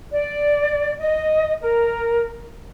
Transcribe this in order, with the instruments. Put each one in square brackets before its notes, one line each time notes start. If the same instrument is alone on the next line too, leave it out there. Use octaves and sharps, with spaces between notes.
[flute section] D5
D#5
A#4